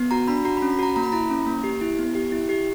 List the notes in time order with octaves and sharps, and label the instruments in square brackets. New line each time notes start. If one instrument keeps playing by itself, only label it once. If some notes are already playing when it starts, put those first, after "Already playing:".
Already playing: [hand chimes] B3
F#4 A#5
D4 B5
F#4 A#5
B5
C#4
B5
F#4 A#5
A#3 A#5
B5
E4 A#5
C#4
A#3
G4
E4
B3
G4
E4
G4